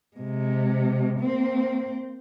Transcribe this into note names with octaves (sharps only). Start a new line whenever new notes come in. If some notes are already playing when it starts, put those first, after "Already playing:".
C3 G#3
A#3 C4